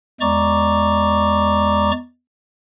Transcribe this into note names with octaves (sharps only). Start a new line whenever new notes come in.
E2 G#3 D5 A#5 C#6 D6